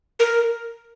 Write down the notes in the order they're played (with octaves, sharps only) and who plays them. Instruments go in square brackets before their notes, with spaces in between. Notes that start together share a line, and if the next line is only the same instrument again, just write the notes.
[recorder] A#4